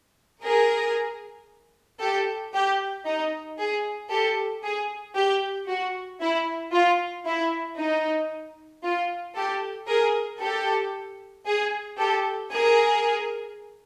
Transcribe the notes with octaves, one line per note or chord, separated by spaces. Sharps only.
G#4 A#4
G4 A4
G4
D#4
G#4
G4 A4
G#4
G4
F#4
E4
F4
E4
D#4
F4
G4 A4
G#4 A#4
G4 A4
G#4
G4 A4
G#4 A#4